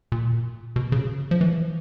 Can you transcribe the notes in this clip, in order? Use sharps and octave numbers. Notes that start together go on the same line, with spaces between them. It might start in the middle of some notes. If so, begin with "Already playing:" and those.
A#2
B2
C#3
F3
E3